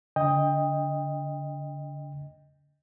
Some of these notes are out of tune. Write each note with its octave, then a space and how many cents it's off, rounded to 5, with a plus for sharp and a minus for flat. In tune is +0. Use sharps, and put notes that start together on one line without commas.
D3 -30 D#5 +10 G5 +25